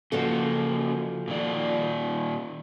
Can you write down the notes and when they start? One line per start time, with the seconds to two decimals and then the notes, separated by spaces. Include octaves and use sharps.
0.12 C#3 F3 A#3 F#4 A4
1.28 A#2 D#3 D5